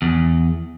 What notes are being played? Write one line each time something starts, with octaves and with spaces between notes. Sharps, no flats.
E2